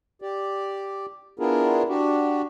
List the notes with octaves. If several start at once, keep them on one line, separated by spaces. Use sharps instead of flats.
G4 D5
B3 D4 E4 F4 G#4 A#4
D4 F#4 G4